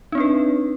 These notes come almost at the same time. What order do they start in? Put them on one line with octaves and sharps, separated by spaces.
D#4 C4 D4 B4